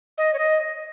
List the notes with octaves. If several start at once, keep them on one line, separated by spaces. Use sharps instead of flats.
D#5
C#5
D#5